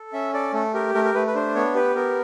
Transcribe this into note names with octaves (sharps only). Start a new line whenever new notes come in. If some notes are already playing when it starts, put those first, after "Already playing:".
Already playing: A4
C#4 E5
A4 D5
A3 A4
G4 A#4
A3 A#4
A#4
A3 B4
B4
D4 C5
B3 C#5
G4 B4
B3 A#4